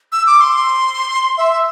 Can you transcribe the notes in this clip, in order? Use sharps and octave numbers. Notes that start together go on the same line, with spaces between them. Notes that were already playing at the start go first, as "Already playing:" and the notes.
E6
D6
C6
E5